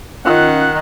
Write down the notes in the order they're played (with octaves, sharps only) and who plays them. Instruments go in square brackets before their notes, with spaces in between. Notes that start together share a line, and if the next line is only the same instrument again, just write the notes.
[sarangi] D#3 [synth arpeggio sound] C#4 F4 [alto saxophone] F#5 [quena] F#6